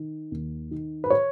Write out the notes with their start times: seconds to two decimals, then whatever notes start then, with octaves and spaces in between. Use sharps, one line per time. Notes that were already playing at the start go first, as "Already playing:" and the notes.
Already playing: D#3
0.31 D#2
0.71 D#3
1.04 B4
1.10 C#5